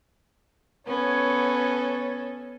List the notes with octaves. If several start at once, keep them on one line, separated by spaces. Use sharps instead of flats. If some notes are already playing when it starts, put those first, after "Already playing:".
B3 C#4 A4 C#5